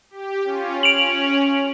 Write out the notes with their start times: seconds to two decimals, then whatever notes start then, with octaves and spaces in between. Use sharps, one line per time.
0.10 G4
0.44 C#4 F4
0.83 C#4 D7 F7 F#7